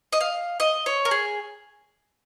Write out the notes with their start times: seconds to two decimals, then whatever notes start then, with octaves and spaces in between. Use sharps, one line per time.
0.13 D#5
0.21 F5
0.60 D#5
0.86 C#5
1.05 A#4
1.11 G#4